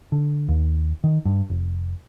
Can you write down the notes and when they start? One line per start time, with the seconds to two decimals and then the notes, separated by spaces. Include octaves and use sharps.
0.12 D3
0.49 D#2
1.04 D#3
1.25 G2
1.50 F1